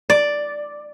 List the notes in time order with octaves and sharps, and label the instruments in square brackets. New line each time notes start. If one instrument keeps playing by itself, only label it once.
[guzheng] D5